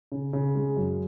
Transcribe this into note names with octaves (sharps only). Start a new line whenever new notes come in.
C#3
C#3
G#3
F#2